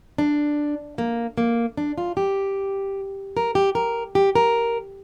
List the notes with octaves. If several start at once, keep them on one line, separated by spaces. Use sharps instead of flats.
D4
A#3
A#3
D4
F4
G4
A#4
G4
A#4
G4
A#4